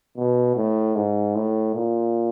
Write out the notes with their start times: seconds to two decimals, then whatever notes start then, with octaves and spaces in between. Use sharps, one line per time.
0.17 B2
0.56 A2
0.95 G#2
1.35 A2
1.74 A#2